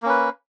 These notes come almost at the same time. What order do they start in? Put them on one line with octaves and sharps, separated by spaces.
A#3 C#4 B4